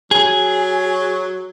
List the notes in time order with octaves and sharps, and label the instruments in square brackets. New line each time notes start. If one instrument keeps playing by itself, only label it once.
[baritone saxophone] F#3 [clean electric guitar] G#4